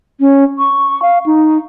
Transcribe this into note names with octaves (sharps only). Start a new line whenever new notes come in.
C#4
C#6
F5
D#4